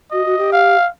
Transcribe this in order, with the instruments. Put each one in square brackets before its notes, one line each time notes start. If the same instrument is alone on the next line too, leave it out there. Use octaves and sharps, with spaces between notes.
[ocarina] F#4 [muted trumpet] D#5
[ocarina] F#4
G4
[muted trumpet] F5